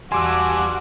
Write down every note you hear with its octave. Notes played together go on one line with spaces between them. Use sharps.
E2 G3 F#4 G#5 A5 C6 D6 E6